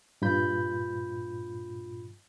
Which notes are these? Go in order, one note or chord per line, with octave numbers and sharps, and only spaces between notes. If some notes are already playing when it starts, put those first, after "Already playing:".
G2 A#2 F4 B5 G6